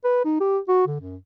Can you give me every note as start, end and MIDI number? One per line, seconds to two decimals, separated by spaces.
0.04 0.24 71
0.25 0.37 63
0.40 0.58 67
0.68 0.85 66
0.87 0.96 50
1.01 1.17 42